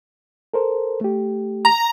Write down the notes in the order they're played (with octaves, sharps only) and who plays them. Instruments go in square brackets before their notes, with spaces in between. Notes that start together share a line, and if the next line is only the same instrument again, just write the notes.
[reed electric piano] A4 A#4 C5
A3 G4
[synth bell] A#5